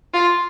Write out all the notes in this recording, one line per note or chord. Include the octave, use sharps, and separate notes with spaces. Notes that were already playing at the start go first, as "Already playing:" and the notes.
F4